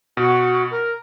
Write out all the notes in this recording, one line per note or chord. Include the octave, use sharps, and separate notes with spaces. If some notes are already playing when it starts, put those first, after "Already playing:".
B2 F#4
A#4